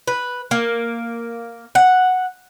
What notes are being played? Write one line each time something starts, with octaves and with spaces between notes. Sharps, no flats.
B4
A#3
F#5